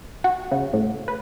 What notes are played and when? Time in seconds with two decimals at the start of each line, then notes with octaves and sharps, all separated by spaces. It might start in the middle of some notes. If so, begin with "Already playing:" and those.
0.24 F#4
0.51 C#3
0.73 A2
1.08 B4